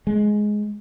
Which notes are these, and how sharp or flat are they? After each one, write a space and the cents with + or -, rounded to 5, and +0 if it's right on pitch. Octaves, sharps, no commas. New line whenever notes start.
G#3 +10